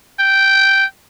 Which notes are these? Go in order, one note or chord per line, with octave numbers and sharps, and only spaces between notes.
G5